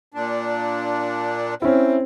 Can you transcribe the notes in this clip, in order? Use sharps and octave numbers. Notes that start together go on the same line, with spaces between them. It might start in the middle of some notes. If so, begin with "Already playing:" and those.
A#2 D4
C4 C#4 E4